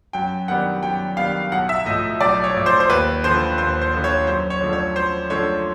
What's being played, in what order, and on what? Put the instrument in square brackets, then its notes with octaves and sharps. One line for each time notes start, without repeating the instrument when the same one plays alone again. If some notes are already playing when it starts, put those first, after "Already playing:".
[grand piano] F#2 G5
D#3 G3 B3 D4 F#5
F#2 G5
D#3 G3 B3 D4 F5
B1 F#5
E5
A2 D#5
F3
B1 D5
C#5
A2 F3
C5
C5
D#2 B4
D3 F3 C5
D#2 C5
C5
D3 F3
C#5
F#2 C5
C#5
D3 F3 A3 D4
C#5
F#2 C5
D3 F3 A3 D4 C#5